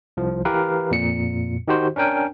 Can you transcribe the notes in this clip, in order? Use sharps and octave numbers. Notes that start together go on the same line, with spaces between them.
C2 F3
E3 G4 A#4 B4 F5
F2 A#2 C#7
D#3 D#4 F#4 G4 C5
C#4 D4 A#4 G5 G#5